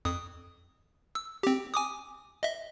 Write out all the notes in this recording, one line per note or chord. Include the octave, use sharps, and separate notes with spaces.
F2 D#6
E6
C4 G4
G#5 D6 D#6
D#5 E5